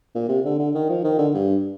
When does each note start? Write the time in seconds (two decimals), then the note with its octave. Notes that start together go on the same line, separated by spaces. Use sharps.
0.15 A#2
0.29 C3
0.45 D3
0.59 D3
0.74 D#3
0.89 F3
1.04 D#3
1.19 D3
1.34 G2